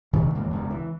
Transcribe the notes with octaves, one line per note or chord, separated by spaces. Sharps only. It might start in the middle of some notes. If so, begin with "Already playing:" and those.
C3 D#3 E3 A3
D#2 G#2 E3 A#3
E1 C#2 F#2
E3